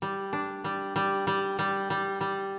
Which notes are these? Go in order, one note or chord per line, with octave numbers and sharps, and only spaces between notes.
G3
D4
G3
G3
G3
G3
G3
G3